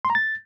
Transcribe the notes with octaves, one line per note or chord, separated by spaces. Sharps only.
C6
A#5
A6